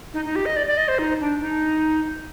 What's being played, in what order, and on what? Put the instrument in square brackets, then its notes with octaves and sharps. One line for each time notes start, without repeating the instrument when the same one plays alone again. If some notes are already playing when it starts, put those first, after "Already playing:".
[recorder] D#4
D#4
G4
D#5
D5
D5
D#5
C5
D#4
D4
D#4